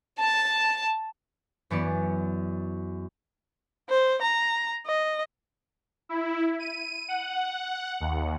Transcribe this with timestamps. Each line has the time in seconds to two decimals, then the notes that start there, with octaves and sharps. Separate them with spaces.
0.20 A5
1.70 F#2 E3 B3 G#4 D5 C#7
3.89 C5
4.21 A#5
4.86 D#5
6.09 E4
6.60 D#7
7.08 F#5
8.00 D#2